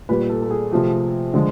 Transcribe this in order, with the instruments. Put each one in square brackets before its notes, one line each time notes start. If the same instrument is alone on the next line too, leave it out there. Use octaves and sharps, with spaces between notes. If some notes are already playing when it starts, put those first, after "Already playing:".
[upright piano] A#2 G3 B4
A4
A4
G#4
C3 F3 A3
D3 F3 G#3